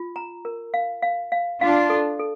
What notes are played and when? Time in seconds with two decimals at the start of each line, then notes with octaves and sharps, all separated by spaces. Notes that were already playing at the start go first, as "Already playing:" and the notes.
Already playing: F4
0.16 A#5
0.45 A#4
0.74 F5
1.02 F5
1.32 F5
1.61 D4 F4 F5
1.90 A4
2.19 A4